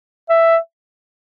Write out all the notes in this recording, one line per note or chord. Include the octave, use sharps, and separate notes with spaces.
E5